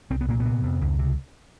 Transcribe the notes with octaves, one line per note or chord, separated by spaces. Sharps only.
C2 C4
B3
A#2 A#3
B3
C3
F2
C#2
C3